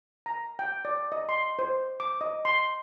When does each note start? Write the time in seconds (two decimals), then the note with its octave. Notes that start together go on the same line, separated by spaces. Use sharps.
0.26 A#5
0.59 G5
0.85 D5
1.12 D#5
1.29 C6
1.59 C5
2.00 D6
2.21 D#5
2.45 C6